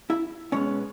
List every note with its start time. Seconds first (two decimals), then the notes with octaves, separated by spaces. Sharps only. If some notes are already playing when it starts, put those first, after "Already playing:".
0.10 E4 E5
0.52 B2 G#3 B3 C#4 C#5